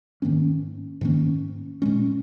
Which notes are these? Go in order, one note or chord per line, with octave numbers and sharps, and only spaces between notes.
G#2 D#3 A#3 C#4
G#2 D#3 A#3 C#4
A#2 G#3 C#4